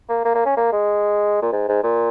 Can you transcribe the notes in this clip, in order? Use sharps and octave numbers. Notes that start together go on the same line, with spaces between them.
A#3
A#3
A#3
C#4
A#3
G#3
A#2
G#2
G#2
A#2